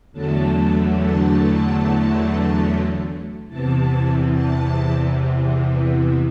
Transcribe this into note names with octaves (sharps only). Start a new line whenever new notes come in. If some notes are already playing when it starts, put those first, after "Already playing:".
E2 D3 F#3 A3 A5
A5
E2 C3 E3 A5
A5